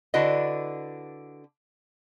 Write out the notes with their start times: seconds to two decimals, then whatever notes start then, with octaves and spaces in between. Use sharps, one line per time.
0.14 D3 D4 E4 F#4 B4 D#5